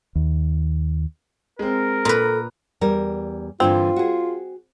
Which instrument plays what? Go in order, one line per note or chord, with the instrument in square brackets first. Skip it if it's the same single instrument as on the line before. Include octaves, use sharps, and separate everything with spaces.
[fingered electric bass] D#2
[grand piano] G#3 C4 [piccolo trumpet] A#4
[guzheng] A#2 B4 [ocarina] A4 [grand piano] A#5
[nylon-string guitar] E2 G3 A#4
[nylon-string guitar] G2 D3 E3 [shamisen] C4 [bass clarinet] F4
[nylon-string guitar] F#4 G#4